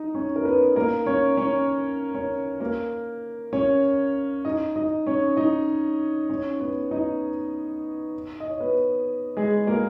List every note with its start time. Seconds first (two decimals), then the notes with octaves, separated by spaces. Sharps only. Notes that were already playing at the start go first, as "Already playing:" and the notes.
Already playing: D#4 D#5
0.15 C#4 C#5
0.36 A#4
0.45 B3 B4
0.76 A#3 A#4
1.06 C#4 C#5
1.37 C#4 C#5
2.14 C#4 C#5
2.60 A#3 A#4
3.53 C#4 C#5
4.45 D#4 D#5
4.76 D#4 D#5
5.06 C#4 C#5
5.37 D#4 D#5
6.29 C#4 C#5
6.60 B3 B4
6.91 D#4 D#5
8.40 D#5
8.50 C#5
8.60 B3 B4
9.37 G#3 G#4
9.67 A#3 A#4